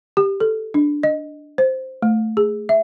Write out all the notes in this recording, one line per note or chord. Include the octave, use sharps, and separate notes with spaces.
G4
A4
D4
D#5
C5
A3
G#4
E5